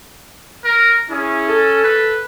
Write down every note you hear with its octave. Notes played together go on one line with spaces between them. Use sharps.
A#4
C#4 E4 G#4
A4
B4